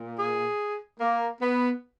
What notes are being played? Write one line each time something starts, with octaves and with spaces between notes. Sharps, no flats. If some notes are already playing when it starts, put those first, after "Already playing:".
Already playing: A#2 A#3
G#4
A#3
B3